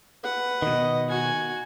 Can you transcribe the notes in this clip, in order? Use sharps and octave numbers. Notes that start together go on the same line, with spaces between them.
B4 F#5
B2 D#3 D#5
F#4 G#5